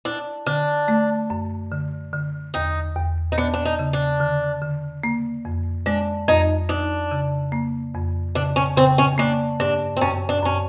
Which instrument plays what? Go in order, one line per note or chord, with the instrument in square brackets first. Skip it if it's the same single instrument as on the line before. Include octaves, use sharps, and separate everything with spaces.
[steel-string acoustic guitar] D4 [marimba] E4
[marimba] D3 [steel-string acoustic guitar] D4
[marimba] A3
F#2
D3
D3
[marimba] E2 [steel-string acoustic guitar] D#4
[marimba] E2
[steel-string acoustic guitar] D#4
[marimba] B3 [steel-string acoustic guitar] D4
[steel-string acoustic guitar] D4
D#4
[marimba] C#3
[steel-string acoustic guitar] D4
[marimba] D3
D3
A#3
F2
[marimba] G#3 [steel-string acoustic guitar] D4
[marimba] F2 [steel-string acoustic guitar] D#4
[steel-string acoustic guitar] D4 [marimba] D#4
[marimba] C#3
A#3
F2
[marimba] C#3 [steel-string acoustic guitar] D4
[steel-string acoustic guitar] C#4
[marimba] C#3 [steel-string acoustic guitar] C4
[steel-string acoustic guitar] C#4
[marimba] A#3 [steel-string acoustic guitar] D4
[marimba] G2 [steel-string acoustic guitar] D4
[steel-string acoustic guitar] C4
[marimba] F#2 [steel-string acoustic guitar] C#4
[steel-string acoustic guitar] D4
[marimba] F#2 [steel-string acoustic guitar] C#4